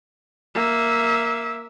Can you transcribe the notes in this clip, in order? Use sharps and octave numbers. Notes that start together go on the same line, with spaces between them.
A#3 E5